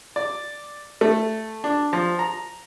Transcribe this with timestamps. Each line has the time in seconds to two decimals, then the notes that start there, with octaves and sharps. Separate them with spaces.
0.16 D5
1.01 A3
1.64 D4
1.93 F3
2.19 A#5